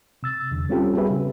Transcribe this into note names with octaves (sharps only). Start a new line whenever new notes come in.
C3 E6 A6
E2 D3
G3 C4 C#4 F4 G4 A4
G3 B3 F#4 G#4 B4 E5
C#3